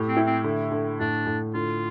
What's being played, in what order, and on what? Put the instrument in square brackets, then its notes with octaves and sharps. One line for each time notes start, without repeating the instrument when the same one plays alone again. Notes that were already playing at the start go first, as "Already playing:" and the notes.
Already playing: [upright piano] A2 G4
[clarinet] C4
[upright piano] E4
[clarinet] C4
[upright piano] D3
D3
[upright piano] A2 [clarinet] D4
[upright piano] A2
[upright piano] D3 [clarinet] F4